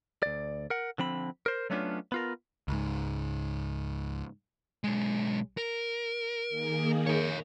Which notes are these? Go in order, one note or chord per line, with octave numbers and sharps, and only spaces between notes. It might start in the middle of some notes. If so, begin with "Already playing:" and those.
D2 D5
A#4 F#5
D3 F3 C4 B5
A#4 C5
F#3 A3 B3 C#4 D4 F4
B3 F4 A#4
C#2 G#2
B1 G#3
A#4
D#3 A#3 G#4
A#4 C#5